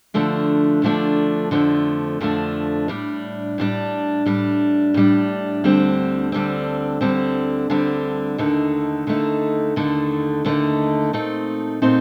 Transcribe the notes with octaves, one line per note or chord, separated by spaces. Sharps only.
F2 D3 F3 A3 D4
F2 D3 F3 A3 D4
F2 D3 F3 A3 D4
F2 D3 F3 A3 D4
A2 G3 D4
A2 G3 D4
A2 G3 D4
A2 G3 D4
D2 D3 G3 C4
D2 D3 G3 C4
D2 D3 G3 C4
D2 D3 G3 C4
D#2 D3 A3 D#4
D#2 D3 A3 D#4
D#2 D3 A3 D#4
D#2 D3 A3 D#4
A#2 A3 C4 D#4
A#2 A3 C4 D#4